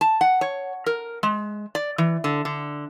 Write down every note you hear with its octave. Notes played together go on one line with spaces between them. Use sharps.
A5
F#5
C#5
A#4
G#3
D5
E3
D3
D3